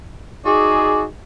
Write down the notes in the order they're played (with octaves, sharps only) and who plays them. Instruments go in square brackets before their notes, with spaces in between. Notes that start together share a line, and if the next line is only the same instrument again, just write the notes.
[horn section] D#4 F#4 G#4 [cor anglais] D5